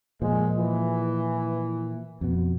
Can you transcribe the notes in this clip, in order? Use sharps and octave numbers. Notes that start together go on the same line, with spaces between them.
A#2 F3 G#3
E3
F2 B2